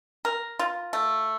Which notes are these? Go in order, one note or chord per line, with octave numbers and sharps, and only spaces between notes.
A#4
F4
A3